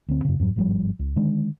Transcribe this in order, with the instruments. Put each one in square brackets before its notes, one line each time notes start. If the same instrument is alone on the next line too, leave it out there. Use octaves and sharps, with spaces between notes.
[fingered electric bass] D2 D3 C4
F#2 C#3
F2 G#2 F#3
G1 G#2 F3 G3
C#2
D3 D#3 G#3 D4